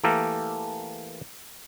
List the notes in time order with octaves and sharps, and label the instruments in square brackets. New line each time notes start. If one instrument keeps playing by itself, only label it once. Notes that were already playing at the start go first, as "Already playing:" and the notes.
[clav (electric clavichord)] E3 A3 A#3 G4 A4 A#4